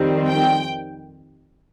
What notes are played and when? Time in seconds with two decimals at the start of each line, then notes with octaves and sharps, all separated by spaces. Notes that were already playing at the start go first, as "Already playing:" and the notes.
Already playing: F2 D#3 G3 C4
0.28 G5